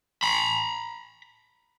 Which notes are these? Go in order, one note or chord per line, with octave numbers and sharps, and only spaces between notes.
A#5 B5